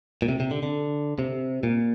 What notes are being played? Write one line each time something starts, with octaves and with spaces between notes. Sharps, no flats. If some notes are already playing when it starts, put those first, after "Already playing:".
A#2
C3
C3
D3
D3
C3
A#2